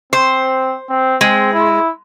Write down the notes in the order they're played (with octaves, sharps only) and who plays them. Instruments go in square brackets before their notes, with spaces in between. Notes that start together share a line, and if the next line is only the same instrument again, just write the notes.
[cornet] C4 [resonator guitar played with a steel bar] C5
[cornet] C4
[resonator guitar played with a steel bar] G#3 [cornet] C4
[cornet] E4